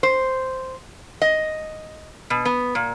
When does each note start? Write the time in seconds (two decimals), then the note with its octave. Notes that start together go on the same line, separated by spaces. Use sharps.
0.03 C5
1.22 D#5
2.30 B2
2.45 B3
2.75 A#2